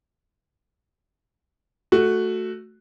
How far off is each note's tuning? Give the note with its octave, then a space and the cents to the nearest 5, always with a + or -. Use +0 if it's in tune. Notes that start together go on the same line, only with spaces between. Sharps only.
A3 +0 F#4 +0